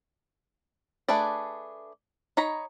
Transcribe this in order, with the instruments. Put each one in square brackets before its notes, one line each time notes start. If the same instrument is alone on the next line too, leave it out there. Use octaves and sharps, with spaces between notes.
[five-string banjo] A3 D4 G#4 B4 D5
D#4 C#5 A#5 B5